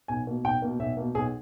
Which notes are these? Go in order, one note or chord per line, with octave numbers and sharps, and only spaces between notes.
B1 G#5
B2 A#3
B1 G5
B2 A#3
B1 E5
B2 A#3
B1 G#4